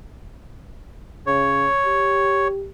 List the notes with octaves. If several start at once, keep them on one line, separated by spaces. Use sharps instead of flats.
C#3 C#5
G4